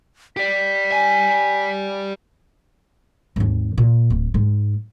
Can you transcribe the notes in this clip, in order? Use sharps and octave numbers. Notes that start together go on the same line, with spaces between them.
G4 D5 B6
G#5
G#1 D#2
A#2
D1
G#2 G#3